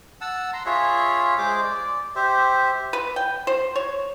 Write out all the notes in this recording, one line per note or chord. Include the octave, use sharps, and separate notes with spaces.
F#5 A5 E6
A#5 C6
F4 G#4 C#5 E5
G#3 G#4 C5 D6
D5
G4 C5 E5
B4
G5
C5
C#5